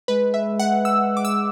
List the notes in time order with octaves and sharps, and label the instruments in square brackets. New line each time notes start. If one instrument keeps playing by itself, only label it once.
[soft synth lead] G#3 [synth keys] B4
[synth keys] E5
F#5
E6
D6
E6